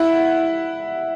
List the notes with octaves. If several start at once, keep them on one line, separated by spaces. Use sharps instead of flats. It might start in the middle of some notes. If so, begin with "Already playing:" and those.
Already playing: E4 F#5